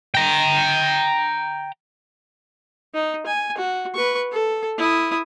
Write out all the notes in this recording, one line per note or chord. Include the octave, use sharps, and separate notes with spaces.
G5 A#5
D#4
G#5
F#4
B4 C#6
A4
E4 D#6